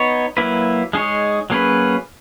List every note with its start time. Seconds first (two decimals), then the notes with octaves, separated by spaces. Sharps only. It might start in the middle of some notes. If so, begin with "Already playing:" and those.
Already playing: B3 D#4 C#5
0.37 F#3 A#3 E4 B4
0.93 G#3 D#4 G#4 C#5
1.50 F#3 A#3 C#4 G#4 B4